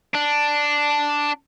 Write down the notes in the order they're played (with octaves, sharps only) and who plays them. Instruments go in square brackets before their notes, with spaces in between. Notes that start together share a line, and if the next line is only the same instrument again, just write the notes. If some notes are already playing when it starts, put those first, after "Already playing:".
[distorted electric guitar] D4